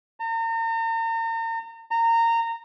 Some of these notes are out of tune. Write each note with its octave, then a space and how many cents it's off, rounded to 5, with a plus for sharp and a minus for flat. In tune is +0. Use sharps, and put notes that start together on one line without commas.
A#5 -40
A#5 -20